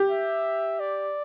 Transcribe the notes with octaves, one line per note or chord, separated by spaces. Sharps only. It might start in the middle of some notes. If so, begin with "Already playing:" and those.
Already playing: G4
E5
D5